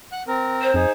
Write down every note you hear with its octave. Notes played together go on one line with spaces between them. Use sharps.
F#5 F#6
C4 A#4
C5
F2 D#4 G#4